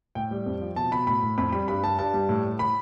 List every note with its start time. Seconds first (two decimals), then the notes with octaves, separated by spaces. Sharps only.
0.15 A2 G5
0.31 G3
0.46 F2
0.61 F3
0.76 B2 A5
0.91 B2 B5
1.07 A2 B5
1.23 A2
1.38 F2 B5
1.52 G3 B5
1.68 G2 B5
1.83 G3 A5
1.99 G2 A5
2.14 G3
2.29 A2
2.44 A2
2.59 A2 B5